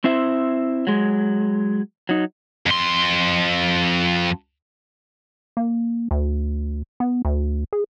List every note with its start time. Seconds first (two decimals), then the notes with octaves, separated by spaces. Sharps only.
0.04 C4 E4 C5 E5
0.87 F#3 G#3
2.09 F#3 D#4
2.66 F2 C6
5.57 A#3
6.11 D2
7.00 B3
7.25 D2
7.73 G#4